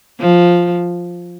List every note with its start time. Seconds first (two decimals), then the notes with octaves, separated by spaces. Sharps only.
0.20 F3